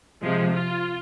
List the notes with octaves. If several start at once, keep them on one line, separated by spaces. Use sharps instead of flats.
C3 F3 G#3
F4